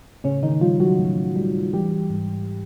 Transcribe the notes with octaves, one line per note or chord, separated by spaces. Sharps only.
A2 C#3 C#4
D#3 D#4
F3 G3 F4
F#3 F#4
A2
G3
E3 G3 G4
G#2